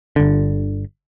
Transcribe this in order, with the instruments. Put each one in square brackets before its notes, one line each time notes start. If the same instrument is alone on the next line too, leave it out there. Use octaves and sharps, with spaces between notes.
[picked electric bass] G1 D3